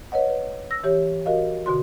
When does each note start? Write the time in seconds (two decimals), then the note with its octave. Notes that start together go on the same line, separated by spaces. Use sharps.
0.12 B4 C#5 D#5 F#5
0.30 B4
0.71 E6 A#6
0.84 E3 G4 C#5
1.26 F#4 A#4 D#5 F5
1.66 B2 D3 F#4 C6